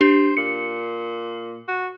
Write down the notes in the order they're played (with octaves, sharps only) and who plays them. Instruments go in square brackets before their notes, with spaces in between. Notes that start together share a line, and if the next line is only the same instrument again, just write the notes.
[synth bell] D4 G4 [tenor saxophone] C5
[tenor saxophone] A#2 [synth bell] C#7
[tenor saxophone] F#4